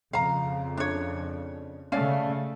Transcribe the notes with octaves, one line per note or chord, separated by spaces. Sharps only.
F2 C#3 F5 A#5
D4 C#5
C#3 A3 C#4 D5 F5